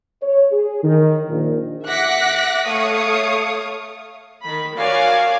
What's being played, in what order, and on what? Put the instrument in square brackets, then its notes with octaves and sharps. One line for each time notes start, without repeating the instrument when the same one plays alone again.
[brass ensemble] C#5
G#4
D#3
A#1
[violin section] E5 F#5 D6 F#6 A#6 B6
A3 C#5 F5 C#6 D#6
[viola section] D#3 B5
F#4 A#4 C#5 D5 F5 G#5